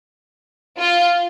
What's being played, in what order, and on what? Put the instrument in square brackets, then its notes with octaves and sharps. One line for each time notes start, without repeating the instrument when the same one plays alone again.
[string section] F4